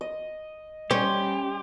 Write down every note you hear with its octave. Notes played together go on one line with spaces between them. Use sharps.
D#5
G3 C#4 G4 C5